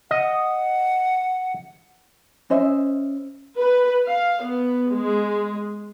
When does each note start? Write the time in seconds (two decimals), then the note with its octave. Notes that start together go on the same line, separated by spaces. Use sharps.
0.11 D#5 F#5
2.50 C#4 C5 D#5 E5
3.58 B4
4.06 F5
4.44 B3
4.91 G#3